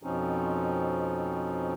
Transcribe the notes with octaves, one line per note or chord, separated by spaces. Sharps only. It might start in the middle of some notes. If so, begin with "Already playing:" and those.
F2 B2 F3 C4 C#4 D#4